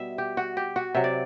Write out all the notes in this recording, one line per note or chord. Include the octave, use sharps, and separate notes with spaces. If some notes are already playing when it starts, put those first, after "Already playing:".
Already playing: B2 G3 E5
G4
F#4
G4
F#4
C3 F#3 E5
D5